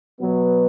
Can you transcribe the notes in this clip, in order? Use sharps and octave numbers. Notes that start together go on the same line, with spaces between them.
B2 F#3 B3